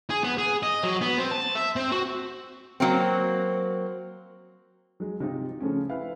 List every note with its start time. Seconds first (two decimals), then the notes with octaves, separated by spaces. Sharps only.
0.10 G#4
0.24 B3
0.38 G#4
0.63 D#5
0.84 F#3
1.01 B3
1.18 C4
1.31 A5
1.55 E5
1.76 C4
1.92 F#4
2.80 F#3 A#3 C4
5.00 F#3 G#3
5.20 C3 D#4 F4
5.60 C#3 F3 A3 C#4
5.89 E4 B4 F5